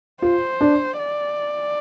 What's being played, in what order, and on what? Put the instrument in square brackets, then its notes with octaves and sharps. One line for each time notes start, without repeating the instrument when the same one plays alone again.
[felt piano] F4 [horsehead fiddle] C5
[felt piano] D4
[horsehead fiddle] D5